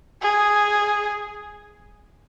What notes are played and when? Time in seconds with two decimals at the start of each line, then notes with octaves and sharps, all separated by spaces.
0.21 G#4